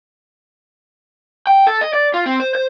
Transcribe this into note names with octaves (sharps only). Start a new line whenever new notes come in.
G5
A4
D#5
D5
F4
C4
C5
C5